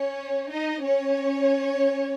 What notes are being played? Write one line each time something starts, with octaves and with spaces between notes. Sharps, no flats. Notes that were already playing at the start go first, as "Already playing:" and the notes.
Already playing: C#4 C#5
D#4 D#5
C#4 C#5